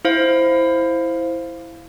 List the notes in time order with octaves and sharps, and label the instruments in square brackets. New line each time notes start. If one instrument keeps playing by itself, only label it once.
[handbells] E4 C5 F5